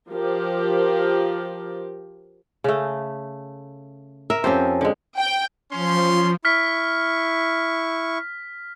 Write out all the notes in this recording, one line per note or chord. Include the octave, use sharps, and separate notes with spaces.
F3 G4 A#4
C#3 A3
A#4 E5
F2 C4 C#4 G4 C5
D3 G#3
G5
F3 C#4 C6
E4 C#6 F6 B6